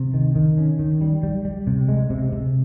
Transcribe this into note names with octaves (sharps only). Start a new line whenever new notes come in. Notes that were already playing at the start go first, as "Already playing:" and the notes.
Already playing: C3
D#3
D#3
C#4
D#3
G3
G3
G3
C3
G#3
C3
C3